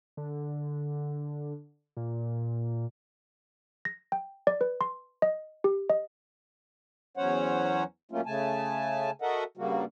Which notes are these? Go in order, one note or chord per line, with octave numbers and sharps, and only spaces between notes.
D3
A#2
A#6
G5
D5
B4
C6
D#5
G4
D#5
E2 F#3 C#4 C5 C#5 F#5
D2 F#3 A3 A#3 C#4 F4
C#3 A3 G#5 A5
F#4 A4 A#4 D#5 E5 F#5
G2 C#3 F#3 G3 A#3 F#4